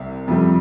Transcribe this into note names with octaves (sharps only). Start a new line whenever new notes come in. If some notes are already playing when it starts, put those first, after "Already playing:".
Already playing: C2 C3
F2 C3 G3